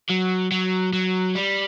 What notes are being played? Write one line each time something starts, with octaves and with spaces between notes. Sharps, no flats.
F#3
F#3
F#3
G3